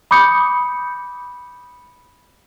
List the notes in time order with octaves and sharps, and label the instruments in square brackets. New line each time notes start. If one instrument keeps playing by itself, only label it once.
[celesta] B5 D6 D#6 G6 C#7